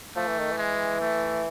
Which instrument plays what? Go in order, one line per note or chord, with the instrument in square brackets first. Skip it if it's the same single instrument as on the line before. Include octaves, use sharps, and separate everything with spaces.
[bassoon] F3 [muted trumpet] A3
[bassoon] E3
D#3
E3
[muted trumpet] G#3
A3